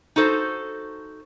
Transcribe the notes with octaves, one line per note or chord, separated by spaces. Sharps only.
D#4 F#4 A4 C5